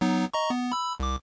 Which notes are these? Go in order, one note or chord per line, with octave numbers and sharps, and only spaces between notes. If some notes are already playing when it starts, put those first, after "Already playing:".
F#3 B3 D#4
D#5 A#5 C#6
B3
B5 E6
C2 D6